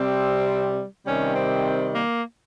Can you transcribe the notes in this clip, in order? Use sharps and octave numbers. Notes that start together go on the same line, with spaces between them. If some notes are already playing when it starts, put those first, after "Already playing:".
Already playing: C3 G3 C4
C3 D#3 G3 C#4
C4
A#3